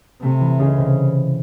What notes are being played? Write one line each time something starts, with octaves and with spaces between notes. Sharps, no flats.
C3 A3
E3
C#2 C#3
C3